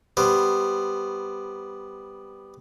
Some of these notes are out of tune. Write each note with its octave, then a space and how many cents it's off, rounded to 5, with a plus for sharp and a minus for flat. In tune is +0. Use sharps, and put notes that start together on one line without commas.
G3 +0 B3 +0 C5 +0